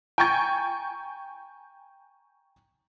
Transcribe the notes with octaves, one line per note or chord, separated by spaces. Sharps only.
G5 G#5 A#5 C#6 G6 G#6